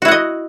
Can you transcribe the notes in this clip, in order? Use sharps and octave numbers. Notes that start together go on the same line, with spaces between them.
E4 F#4 D#5 F#5